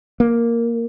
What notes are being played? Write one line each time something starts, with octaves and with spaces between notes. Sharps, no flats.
A#3